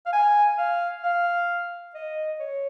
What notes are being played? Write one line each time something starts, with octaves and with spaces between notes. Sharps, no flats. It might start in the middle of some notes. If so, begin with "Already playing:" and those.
F5
G#5
F5
F5
D#5
C#5